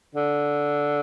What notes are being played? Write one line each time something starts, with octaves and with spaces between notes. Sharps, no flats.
D3